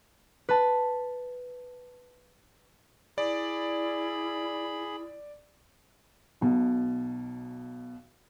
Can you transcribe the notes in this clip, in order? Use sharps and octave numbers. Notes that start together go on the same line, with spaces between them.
B4 A5
E4 G#4 D5 B5
B1 B2